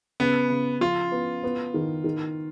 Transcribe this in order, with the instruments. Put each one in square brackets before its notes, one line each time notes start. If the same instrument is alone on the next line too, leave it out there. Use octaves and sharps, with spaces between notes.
[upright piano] C#3 [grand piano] B3
[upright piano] C#3
[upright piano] F3 [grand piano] F4
[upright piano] B3
B3
D#3
D#3